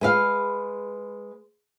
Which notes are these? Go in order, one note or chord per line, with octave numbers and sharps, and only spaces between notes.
G#3 B4 F5